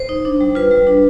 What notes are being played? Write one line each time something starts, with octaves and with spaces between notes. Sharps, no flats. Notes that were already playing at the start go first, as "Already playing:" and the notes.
Already playing: C5
D#4
D4
G3
F4 B4
G3
D4